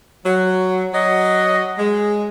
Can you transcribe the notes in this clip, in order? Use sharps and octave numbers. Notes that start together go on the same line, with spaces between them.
F#3
F#3 D#5
G#3